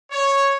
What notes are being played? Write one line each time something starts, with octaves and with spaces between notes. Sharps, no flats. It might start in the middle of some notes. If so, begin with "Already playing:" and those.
C#5